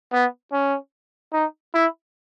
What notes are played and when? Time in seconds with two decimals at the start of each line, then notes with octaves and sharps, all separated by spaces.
0.13 B3
0.52 C#4
1.33 D#4
1.74 E4